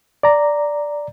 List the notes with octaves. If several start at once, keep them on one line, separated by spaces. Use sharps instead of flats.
D5 A#5